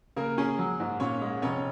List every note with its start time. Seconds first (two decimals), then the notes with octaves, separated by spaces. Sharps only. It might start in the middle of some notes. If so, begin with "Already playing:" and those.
0.16 C#3 A#3 A#4
0.38 C#4 G#4
0.59 F#3
0.80 G#2
1.00 A#2 C#4 C#5
1.22 G#3
1.42 F1 C#4 C#5